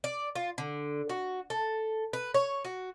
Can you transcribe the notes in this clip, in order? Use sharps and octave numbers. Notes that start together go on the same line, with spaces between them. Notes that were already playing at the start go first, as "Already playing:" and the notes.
D5
F4
D3
F#4
A4
B4
C#5
F#4